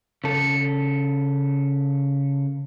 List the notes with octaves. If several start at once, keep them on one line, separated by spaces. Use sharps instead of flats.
C#3 A4